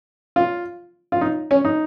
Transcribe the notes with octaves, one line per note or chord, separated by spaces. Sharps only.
F4
F4
D#4
C#4
D#4